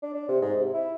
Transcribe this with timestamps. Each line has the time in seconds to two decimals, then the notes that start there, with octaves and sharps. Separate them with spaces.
0.03 D4
0.14 D4
0.28 C3
0.42 G#2
0.59 C3
0.73 E4